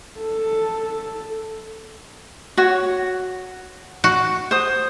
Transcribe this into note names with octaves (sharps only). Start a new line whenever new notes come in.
A4
F#4 C#5
F#4
C5 D#6